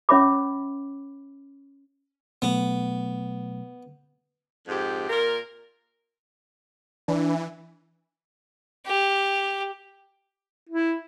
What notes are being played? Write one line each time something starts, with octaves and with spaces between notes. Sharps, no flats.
C#4 C#5 E5 B5 D6
B2 F#3 A3 B3
F2 G#2 G4
A#2 A#4
E3 D4
G4
E4